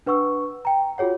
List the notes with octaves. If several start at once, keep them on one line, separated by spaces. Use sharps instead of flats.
D4 B4 F#5 C#6 E6
G5 A#5
F4 F#4 G#4 C#5 F#5